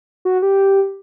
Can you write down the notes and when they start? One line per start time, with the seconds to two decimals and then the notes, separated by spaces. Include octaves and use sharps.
0.25 F#4
0.42 G4